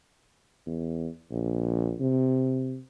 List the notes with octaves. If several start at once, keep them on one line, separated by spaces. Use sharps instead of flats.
E2
A#1
C3